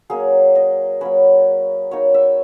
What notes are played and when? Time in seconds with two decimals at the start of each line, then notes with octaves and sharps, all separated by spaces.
0.10 F#3 A#3 C#4 G#4
0.55 D#5
1.01 F#3 A#3 C#4 B4
1.91 F#3 A#3 D#4 C#5
2.14 E5